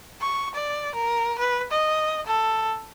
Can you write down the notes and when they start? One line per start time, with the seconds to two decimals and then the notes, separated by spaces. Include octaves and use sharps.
0.21 C#6
0.55 D5
0.95 A#4
1.38 B4
1.72 D#5
2.27 A4